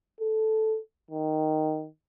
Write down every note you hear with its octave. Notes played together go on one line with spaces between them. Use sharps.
A4
D#3